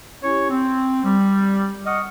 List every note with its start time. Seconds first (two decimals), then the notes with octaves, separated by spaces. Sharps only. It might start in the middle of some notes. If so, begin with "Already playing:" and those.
0.23 C#4 E4 G4 C#5
0.50 C4
1.04 G3
1.86 D#5 F#5 C#6 D#6 F6